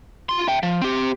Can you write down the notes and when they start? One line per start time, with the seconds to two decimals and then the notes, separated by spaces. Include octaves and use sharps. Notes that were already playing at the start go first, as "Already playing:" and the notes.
0.29 F4 C6
0.48 E5 G5
0.63 F3
0.82 C4 G4